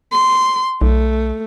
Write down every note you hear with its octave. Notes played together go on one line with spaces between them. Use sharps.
C6
B1 A3